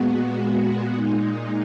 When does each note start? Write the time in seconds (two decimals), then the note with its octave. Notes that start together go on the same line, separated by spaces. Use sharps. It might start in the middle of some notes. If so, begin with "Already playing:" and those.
Already playing: A#2 G#3 B3 F#4
0.94 A#2 G#3 D#4